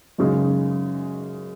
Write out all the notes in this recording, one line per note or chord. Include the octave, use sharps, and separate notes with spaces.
F#2 C#3 G#3 D#4